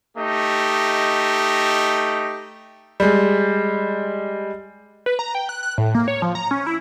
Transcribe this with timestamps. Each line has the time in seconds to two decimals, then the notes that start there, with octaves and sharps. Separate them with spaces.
0.17 A3 D#4 G4 D#5
3.00 G3 G#3
5.06 B4
5.19 A#5
5.35 G5
5.49 F#6
5.63 F#6
5.78 A2
5.95 A#3
6.08 C#5
6.22 F3
6.35 A#5
6.51 C#4
6.67 E4